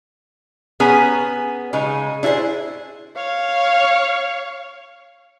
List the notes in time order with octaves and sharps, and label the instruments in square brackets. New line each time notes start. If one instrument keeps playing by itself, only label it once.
[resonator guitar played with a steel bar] B3 C#4 G#4 G#5 A#5
C#3 G#3 D#4
D4 E4 F#4 G#4 C5
[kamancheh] C#5 F5